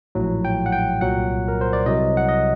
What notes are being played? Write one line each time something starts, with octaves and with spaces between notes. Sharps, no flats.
A#1 A2 F#3
G5
F#5
G5
C2 A#2 F#3 F#5
A#4
C5
D5
C2 C3 F#3 D#5
F#5
D#5